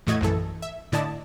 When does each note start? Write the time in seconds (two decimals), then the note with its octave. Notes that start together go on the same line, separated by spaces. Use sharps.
0.07 E2 A2 A3 F#4 D#5 G#6
0.21 A#1 F#2 E3 A4
0.62 E5
0.92 A2 D3 E4 D5 D#5 A5